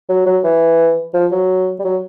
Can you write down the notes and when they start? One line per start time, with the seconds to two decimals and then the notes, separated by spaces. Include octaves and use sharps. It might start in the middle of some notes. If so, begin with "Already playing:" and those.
0.09 F#3
0.26 F#3
0.44 E3
1.14 F3
1.32 F#3
1.79 G3
1.85 F#3